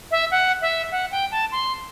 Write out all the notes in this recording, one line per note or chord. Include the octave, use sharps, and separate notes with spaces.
E5
F#5
E5
F#5
G5
A5
C6